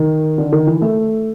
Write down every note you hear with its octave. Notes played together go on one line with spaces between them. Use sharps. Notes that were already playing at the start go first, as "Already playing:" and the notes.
Already playing: D#3
D3
D#3
E3
A3